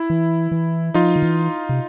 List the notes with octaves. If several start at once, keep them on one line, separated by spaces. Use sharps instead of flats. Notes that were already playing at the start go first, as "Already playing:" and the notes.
Already playing: E4
E3
E3
F3 D#4 F4
D#3
E3
C3